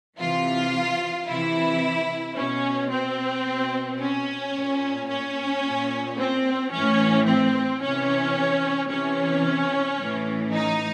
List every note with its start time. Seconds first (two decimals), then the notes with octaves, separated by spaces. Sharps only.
0.18 C3 E3 F4
1.27 C3 E3 E4
2.35 B2 C#4
2.90 C4
3.44 B2
3.99 C#4
4.54 A#2
5.09 C#4
5.63 A#2
6.17 C4
6.71 E3 C#4
6.76 A2
7.25 C4
7.80 C3 E3 C#4
8.89 C3 E3 C#4
9.99 A2 E3
10.52 D#4